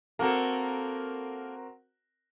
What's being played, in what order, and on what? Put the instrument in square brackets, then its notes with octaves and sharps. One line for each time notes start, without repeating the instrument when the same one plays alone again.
[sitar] A#3 A4 [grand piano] C4 F#4 A#4